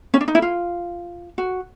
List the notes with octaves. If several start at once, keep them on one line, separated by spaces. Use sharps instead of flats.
C#4
D4
D#4
E4
F4
F#4